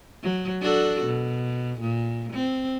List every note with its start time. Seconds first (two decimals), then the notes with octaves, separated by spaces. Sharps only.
0.23 F#3
0.62 D4 F#4 A4
1.06 B2
1.80 A#2
2.33 C4